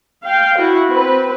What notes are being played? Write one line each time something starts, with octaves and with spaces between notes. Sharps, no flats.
F5 G5
E4 F#4
C4 B4